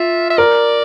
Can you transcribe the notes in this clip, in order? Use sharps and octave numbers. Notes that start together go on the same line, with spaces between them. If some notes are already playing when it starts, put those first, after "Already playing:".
Already playing: F4 E5
E5
A#4 D5